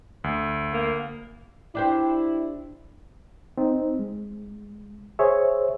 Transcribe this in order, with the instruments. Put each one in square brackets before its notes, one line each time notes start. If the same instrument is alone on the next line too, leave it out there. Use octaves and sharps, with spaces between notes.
[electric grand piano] D2
[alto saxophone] A#3
[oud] D4 G4 C5 [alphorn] E4
[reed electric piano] C4 D#4
G#3
G#4 C5 C#5 E5